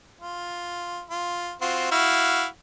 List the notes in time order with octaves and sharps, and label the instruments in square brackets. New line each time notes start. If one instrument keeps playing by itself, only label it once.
[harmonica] F4
F4
C4 F4 F#4
E4 F#4 F5